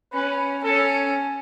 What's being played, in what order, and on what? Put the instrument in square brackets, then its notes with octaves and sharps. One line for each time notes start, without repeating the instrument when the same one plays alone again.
[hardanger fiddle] C#4 [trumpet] B4
[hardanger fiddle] C#4 [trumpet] A4